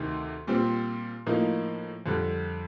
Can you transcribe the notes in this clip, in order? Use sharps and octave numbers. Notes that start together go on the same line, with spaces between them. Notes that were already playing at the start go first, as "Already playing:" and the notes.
Already playing: D2 C3 D#3
A#2 G3 C4
A2 F3 A#3 D#4
F2 D3 G3